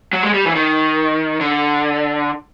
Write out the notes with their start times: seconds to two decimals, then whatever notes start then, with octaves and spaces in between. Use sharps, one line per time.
0.13 F#3
0.23 G#3
0.34 G3
0.46 E3
0.55 D#3
1.41 D3